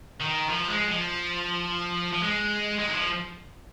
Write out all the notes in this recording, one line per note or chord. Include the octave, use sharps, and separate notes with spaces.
D#3
F3
G#3
F3
F3
G#3
G#3
D#3
F3